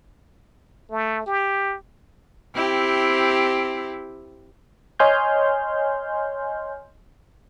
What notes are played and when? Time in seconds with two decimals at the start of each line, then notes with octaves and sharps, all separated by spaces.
0.91 A3
1.27 G4
2.55 C4 E4 G4
4.99 C#5 D#5 G#5 C6 F6 G6